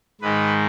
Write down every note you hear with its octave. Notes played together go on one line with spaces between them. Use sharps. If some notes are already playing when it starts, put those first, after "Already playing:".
G#2 D#3 G#3 B4